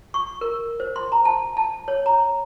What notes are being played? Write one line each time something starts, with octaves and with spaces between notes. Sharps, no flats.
C#6
A#4
C5
C6
A#5
A5
A5
C#5
A#5